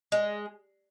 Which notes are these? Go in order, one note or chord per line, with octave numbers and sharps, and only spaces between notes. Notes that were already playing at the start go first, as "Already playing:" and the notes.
G#3